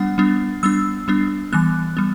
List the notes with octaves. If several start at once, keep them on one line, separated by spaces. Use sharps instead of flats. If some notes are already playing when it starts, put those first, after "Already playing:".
Already playing: G3 B3 D4 F#5
G3 B3 D4
G3 B3 D4 E6
G3 B3 D4
E3 G3 B3 F#6
G3 B3